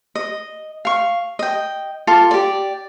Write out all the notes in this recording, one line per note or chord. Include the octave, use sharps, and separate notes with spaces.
D#5
F5 C#6
D#5 G5
F4 A4 F5 D6
G4 D5